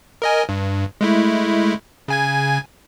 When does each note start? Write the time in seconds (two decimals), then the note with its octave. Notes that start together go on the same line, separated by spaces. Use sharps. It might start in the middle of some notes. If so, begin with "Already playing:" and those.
0.22 A#4 D#5 G#5
0.49 G2
1.01 G#3 A3 E4
2.08 C#3 G#5 G#6